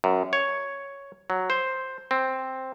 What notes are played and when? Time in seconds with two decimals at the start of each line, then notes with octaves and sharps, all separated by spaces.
0.04 F#2
0.33 C#5
1.30 F#3
1.50 C5
2.11 C4